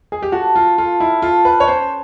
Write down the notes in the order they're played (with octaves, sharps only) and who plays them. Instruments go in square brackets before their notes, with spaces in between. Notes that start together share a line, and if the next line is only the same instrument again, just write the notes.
[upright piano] G#4
G4
[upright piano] F#4 [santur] A4
[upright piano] F4
[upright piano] F4 [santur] A4
[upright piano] E4
[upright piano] F4 [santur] A4
[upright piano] B4
C#5
[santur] C#4 [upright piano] C5